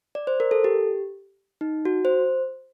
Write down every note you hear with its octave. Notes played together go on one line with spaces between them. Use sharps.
D5
C5
A#4
A4
G4
D#4
F#4
C5